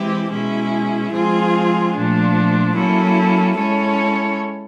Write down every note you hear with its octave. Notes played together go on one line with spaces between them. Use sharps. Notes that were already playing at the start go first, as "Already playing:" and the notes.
Already playing: E3 G#3 C4 E4 G4
B2 G#3 C#4 E4 G#4
F3 G#3 C4 F4 G#4
A#2 F3 A3 D4
F#3 A#3 C#4 E4 A4
G#3 C#4 E4 A4 C#5